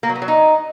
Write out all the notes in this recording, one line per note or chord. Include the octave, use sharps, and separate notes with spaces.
A#3
F#3
B3
F#3
D#4